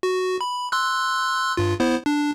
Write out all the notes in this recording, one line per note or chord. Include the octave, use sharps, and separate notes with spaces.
F#4
B5
C6 E6 F#6
G2 F4
B3 E4 C5
D4